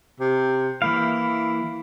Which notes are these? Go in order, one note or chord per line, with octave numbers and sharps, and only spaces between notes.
C3
E3 A#3 E4 F5